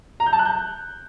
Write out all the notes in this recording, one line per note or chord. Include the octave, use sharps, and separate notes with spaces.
A#5
G6
A5
F#6
G6